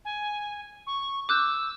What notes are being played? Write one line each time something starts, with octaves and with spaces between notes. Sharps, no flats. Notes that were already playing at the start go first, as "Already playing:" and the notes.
G#5
C#6
D6 E6 F#6 G6